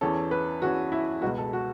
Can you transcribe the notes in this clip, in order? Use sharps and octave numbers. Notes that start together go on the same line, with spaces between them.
E2 E3 C#4 A4
B4
E2 E3 C#4 F#4
E4
C#2 B2 B3 F#4
A4
F#4